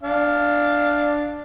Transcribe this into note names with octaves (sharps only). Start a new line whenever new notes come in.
D4 F5